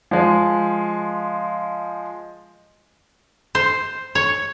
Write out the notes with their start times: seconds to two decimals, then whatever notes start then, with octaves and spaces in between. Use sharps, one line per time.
0.11 F3 G#3
3.55 C5
4.15 C#5